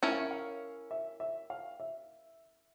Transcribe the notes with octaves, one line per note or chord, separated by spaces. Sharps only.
C#4 E4 A#4 C#5
F5
E5
F5
E5
E5
F5
E5